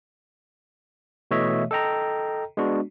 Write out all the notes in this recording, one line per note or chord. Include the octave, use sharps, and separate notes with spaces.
B2 E3 A3 C#5 D#5 E5
A4 D#5 G5 A#5
G#3 B3 D4 F#4